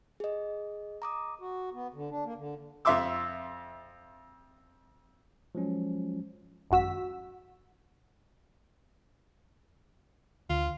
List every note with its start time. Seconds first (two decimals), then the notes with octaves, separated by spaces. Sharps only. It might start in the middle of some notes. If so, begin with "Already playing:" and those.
0.20 G#4 D#5
1.02 A#5 D6 D#6
1.39 F#4
1.73 B3
1.94 D3
2.10 D4
2.25 A#3
2.37 D3
2.85 F2 F4 E5 C6 D6 E6
5.55 F3 F#3 G#3 C#4
6.71 G#1 F#2 F#4 E6 B6
10.50 D2 F4